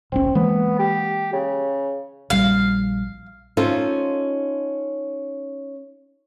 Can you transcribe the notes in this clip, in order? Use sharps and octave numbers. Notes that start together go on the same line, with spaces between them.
D1 A#1 C4 C#4
E3 G#3 A#3 B3
G4
C#3
A#1 G3 F5
C#4 D#4 F4 A4 C5